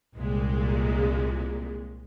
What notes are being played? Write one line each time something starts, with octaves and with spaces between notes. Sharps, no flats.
C2 A#2 G#3